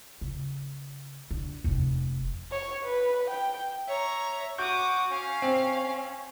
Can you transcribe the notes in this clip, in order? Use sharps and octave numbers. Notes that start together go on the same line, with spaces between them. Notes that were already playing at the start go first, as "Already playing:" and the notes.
C#3
D3
F1 F2
C#5
B4
G5
C#5 E5 A#5
F#4 D6 D#6 G6
C#4 F5
C4